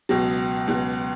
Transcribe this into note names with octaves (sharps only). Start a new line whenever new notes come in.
C#2 B2 F#3
C#2 B2 F#3